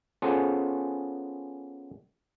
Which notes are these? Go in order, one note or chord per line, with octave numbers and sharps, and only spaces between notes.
B3 C#4 F4 G#4 A4 C5